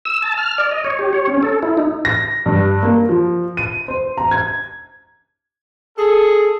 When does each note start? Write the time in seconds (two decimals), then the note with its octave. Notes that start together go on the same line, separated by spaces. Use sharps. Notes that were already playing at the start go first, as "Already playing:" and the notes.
0.05 E6
0.22 A5
0.38 F6
0.58 D5
0.71 D#5
0.84 C#5
0.99 G4
1.13 C#5
1.27 C#4
1.43 A4
1.63 E4
1.77 D#4
2.05 A#6
2.46 G2
2.83 A#3
3.09 F3
3.57 D#7
3.88 C5
4.17 A#5
4.31 G#6
5.98 G#4 A4